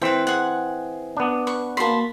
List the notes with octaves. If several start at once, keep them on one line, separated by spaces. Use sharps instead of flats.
E3 C4 B4 G5
G#4 F#5
B3 D4
B4 C#6
A#3 F#4 A5 B5 C6